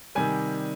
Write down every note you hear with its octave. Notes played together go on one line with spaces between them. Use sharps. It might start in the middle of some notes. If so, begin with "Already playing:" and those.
C3 D#3 G3 G#5